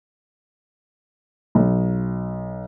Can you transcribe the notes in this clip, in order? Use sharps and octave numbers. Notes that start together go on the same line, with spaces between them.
B1